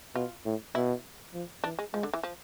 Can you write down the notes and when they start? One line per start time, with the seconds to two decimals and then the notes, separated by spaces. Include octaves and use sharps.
0.15 B2 F4
0.45 A2
0.75 B2 E4
1.34 F3
1.64 E3 D4
1.79 G#3
1.94 F3 G#3
2.03 D3
2.14 E3
2.23 F3